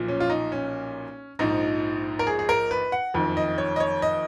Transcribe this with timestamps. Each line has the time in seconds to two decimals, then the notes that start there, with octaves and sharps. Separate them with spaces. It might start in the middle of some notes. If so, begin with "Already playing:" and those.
Already playing: B1 A#2 F3
0.08 C#4
0.20 F4
0.30 D#4
0.52 C#4
1.39 A#1 G#2 F3 D#4
2.19 A#4
2.27 G#4
2.39 G#4
2.49 A#4
2.71 B4
2.92 F#5
3.14 F#1 F2 D#3
3.37 D#5
3.58 C#5
3.76 D#5
3.80 C#5
4.02 D#5